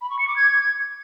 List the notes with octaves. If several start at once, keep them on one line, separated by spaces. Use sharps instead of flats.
B5
C#6
C#7
D6
G#6